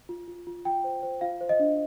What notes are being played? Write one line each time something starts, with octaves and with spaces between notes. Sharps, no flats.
F4
F4
F4
F4 G5
C5
C5
F4 F5
C5
D#5
D4